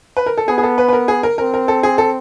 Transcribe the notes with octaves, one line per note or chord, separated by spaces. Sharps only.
B4
A#4
A4
B3 G#4
G#4
A4
B4
B4
A#4
G#4
A#4
C4 A#4
A#4
A4
G#4
A4